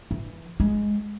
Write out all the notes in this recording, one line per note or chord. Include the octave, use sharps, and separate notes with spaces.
E3
G#3